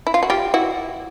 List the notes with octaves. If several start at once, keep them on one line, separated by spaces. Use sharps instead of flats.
E4
F4
F#4
F4 G4
E4 F#4